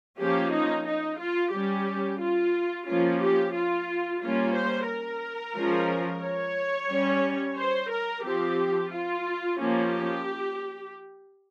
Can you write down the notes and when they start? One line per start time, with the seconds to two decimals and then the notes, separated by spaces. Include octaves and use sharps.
0.18 F3 A#3 C#4 G4
0.52 D#4
0.86 D#4
1.19 F4
1.52 G3 C#4 G4
2.20 F4
2.87 F3 A#3 C#4 F4
3.21 G4
3.54 F4
4.21 G3 A#3 C#4 F4
4.55 C5
4.88 A#4
5.56 F3 G#3 C#4
6.23 C#5
6.90 G3 C#4
7.57 C5
7.91 A#4
8.24 F3 C4 G4
8.91 F4
9.59 F3 A#3 C#4 G4